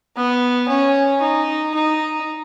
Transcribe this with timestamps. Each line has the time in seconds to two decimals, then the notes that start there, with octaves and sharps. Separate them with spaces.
0.16 B3
0.68 C#4
1.21 D#4
1.74 D#4